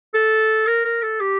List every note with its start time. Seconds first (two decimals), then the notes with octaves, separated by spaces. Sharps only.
0.14 A4
0.67 A#4
0.85 A#4
1.02 A4
1.21 G4